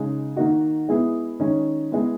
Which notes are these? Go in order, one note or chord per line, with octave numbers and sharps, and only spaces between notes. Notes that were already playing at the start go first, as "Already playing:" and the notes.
Already playing: C#3 G#3 D#4
D#3 A#3 D#4 F#4
G#3 B3 E4 G#4
D#3 G#3 C#4
G#3 B3 E4